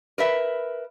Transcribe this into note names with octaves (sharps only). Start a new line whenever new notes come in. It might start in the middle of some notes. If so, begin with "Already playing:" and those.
A#4 B4 E5